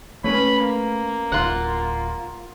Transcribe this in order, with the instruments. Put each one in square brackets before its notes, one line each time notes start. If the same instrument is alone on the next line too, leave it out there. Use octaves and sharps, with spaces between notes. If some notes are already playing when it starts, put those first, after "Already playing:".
[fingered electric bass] A3 [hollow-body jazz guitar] C#4 B4 C#5 [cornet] B5
[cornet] A#3
[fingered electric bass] D1 [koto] F4 F#5